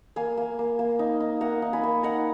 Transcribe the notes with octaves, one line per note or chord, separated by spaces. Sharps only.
A#3 F5 G#5
A#3
A#3
A#3
D#4
D#4
A#3 F#5 A#5
D#4
G#5 B5
A#3
D#4 F#5 A#5